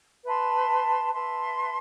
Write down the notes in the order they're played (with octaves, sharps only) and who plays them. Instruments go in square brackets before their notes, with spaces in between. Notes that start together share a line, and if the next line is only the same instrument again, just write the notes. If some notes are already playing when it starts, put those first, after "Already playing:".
[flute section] B4 E5 A5 C6
B4 E5 A5 C6